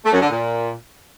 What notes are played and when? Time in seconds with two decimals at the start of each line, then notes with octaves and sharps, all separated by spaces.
0.05 A3
0.13 F#2
0.21 D3
0.29 A#2